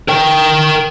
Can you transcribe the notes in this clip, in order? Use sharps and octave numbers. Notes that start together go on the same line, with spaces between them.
A#4 G5